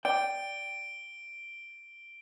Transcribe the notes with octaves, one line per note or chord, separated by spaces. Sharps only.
D5 G5 D7 G7